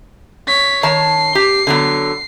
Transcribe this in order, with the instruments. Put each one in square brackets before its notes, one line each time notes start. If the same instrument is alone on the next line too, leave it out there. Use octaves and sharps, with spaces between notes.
[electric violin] C#5 B6
[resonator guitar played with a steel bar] D#3 C#5 A5 [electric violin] C7
[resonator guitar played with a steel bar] G4
D3 F#3 B3